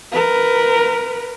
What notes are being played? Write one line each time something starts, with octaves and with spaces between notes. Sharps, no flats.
A#4 B4